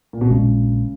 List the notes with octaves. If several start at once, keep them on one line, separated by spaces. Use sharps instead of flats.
A#2
B2
A#1 A#2 C#3 G#3